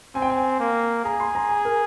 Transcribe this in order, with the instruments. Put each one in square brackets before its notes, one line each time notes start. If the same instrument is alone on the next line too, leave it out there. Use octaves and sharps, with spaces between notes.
[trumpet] C4 [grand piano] G#5
[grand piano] G5
G#5
[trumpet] A#3
[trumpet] G#4 [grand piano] A#5
[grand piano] C6
A#5
G#5
A#4